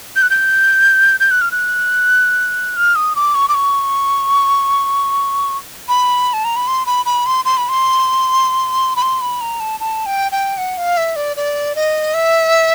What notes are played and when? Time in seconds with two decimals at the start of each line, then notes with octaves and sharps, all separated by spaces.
0.16 G6
0.22 F#6
0.30 G6
1.20 G6
1.31 F#6
1.41 F6
1.52 F#6
2.77 F6
2.96 D#6
3.16 D6
3.35 C#6
3.49 D6
3.55 C#6
5.88 B5
6.33 A5
6.45 A#5
6.56 B5
6.68 C6
6.86 B5
7.06 B5
7.26 C6
7.45 C6
7.57 B5
7.69 C6
8.96 B5
9.02 C6
9.21 B5
9.41 A#5
9.60 A5
9.80 A5
10.06 G5
10.32 G5
10.58 F#5
10.78 F5
10.97 E5
11.16 D5
11.37 D5
11.76 D#5
12.14 E5